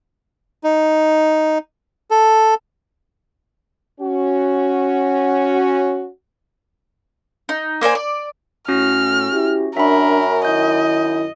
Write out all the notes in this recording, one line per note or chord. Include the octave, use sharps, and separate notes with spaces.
D#4
A4
C#4 F#4
D#4
A#3 C5 D5 G#5
D5
A2 C#4 F#4 F6 A#6
E4 G4
F#2 D4 A#4 E5 B5
D#3 E4 D#5 G6